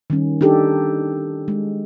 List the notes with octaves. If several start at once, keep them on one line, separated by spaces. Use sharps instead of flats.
D#3 G3 C#4
D4 D#4 G4 A4
G#3